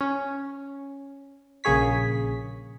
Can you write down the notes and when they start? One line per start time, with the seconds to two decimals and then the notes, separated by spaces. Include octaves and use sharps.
0.01 C#4
1.64 A#1 C#3 A#3 G#4 C#5 B6